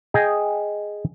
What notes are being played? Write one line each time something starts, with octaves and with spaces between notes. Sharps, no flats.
G#4 D#5 G5